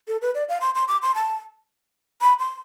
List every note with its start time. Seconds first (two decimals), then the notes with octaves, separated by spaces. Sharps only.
0.08 A4
0.22 B4
0.35 D5
0.49 F5
0.61 C6
0.75 C6
0.88 D6
1.02 C6
1.15 A5
2.21 B5
2.39 C6